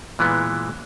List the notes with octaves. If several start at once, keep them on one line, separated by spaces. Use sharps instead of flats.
A#2 E3 G#3 B3